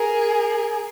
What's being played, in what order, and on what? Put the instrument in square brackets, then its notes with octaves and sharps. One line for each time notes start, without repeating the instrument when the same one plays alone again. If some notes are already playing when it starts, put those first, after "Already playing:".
Already playing: [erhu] G#4 [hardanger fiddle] A#4